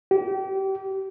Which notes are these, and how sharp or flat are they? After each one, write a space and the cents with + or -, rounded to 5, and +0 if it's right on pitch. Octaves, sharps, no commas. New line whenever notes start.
G4 -30